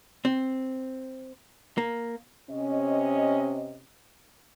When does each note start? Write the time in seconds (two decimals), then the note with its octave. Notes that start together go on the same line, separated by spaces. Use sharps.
0.25 C4
1.78 A#3
2.50 C3 C#4 D#5